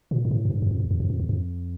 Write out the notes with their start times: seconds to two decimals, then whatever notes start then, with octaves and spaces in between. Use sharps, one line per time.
0.11 A#2
0.25 G#2
0.31 A2
0.45 F#2
0.51 G2
0.62 F#2
0.71 F2
0.80 E2
0.91 E2
1.00 F#2
1.10 F2
1.20 E2
1.29 F2